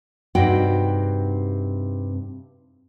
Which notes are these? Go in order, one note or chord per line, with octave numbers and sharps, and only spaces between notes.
G2 C3 D#4 F#4 G5